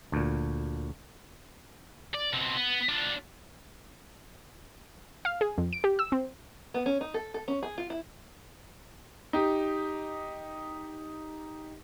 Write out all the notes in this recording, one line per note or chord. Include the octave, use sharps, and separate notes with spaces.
D2 A#2
D5
B2 C4
B3
D4 F4
F5
G#4
F2
D7
G4
E6
C4
B3
C#4
D#4
A4
A4
C#4
G#4
F4
E4
D#4 G4